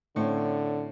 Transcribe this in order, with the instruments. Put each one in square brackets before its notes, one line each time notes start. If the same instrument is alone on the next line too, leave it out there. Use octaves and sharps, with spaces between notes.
[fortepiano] A2 C4 C#4 [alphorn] D3